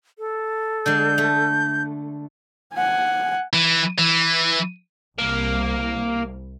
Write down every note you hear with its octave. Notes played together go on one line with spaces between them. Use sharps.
A4
D3 G#3 G6
A3
F#5 G#5
E3
E3
C2 A#3